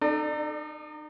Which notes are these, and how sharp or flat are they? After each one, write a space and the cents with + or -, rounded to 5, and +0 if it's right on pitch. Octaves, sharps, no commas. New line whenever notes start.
D#4 -30 A4 +0 D5 +30